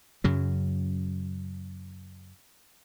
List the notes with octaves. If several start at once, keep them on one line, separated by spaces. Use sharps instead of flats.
F#2 C#3 F#3